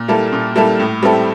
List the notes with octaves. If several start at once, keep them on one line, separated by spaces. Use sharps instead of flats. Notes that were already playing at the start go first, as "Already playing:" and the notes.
Already playing: A#2
G3 A#3 E4 A4
A#2
G3 A#3 E4 A4
A2
G3 C4 E4 A4